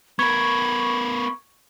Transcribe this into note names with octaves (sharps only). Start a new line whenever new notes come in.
B3 A#4 B5 C#6 G#6